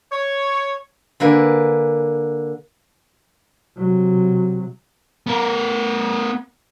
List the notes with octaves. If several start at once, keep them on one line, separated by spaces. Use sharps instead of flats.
C#5
D3 A#3 B4 G#5
C3 F#3
B3 A#4